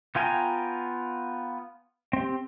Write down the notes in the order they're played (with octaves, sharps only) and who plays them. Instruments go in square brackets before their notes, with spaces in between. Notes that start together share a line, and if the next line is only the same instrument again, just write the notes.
[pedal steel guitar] B3 F4 G5 G#5 A#5
C4 G4